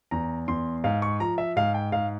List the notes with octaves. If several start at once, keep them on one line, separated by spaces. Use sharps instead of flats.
E2 A#5
E2 C6
G#2 F5
C#6
F3 A#5
E5
G#2 F5
G5
G#2 F5